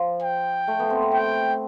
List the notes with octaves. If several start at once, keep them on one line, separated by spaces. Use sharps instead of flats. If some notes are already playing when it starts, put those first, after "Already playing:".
Already playing: F3
G5
A3
B3
C4
C4
G5